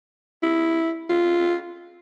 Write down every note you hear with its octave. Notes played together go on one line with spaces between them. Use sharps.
E4
F4